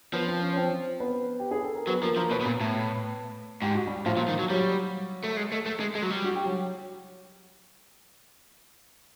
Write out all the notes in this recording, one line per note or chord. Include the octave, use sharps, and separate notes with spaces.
F3 B3 B4
C4 C5
C#4 C#5
C#5
C4 C5
B3 B4
G4
G#4
A4
A#4
F#3 B3 B4
F3 A#3 A#4
F3 A#3 A#4
B2 B3 B4
B2
A#2
A2
G#2 G4
F#4
G3 G4
A2 F3 F4
A#2
D#3
F#3
F#3 G3 F#4
A3
G#3
A3
A3
G#3
G#3
F#3
G3
F#4
G4
F#3 F#4